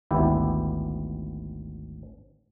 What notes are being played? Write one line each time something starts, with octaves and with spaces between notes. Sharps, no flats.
G#1 D2 B3 E4 G4